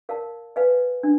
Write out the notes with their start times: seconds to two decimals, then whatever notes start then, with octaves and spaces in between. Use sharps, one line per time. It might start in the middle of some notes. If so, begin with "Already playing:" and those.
0.09 A#4 D5 F5 A5
0.56 B4 D5 F5 G#5
1.03 D4